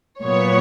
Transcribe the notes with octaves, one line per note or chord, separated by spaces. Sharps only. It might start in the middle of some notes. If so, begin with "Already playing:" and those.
A#2 F#3 B3 C#5